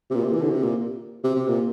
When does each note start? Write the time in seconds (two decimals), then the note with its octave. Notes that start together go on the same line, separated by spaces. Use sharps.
0.10 C3
0.15 A#2
0.24 C3
0.33 E3
0.42 D3
0.50 C3
0.63 A#2
1.24 C3
1.36 C3
1.48 A#2